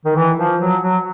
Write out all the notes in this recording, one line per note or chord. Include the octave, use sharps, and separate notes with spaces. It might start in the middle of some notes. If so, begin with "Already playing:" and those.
D#3
E3
F3
F#3
F#3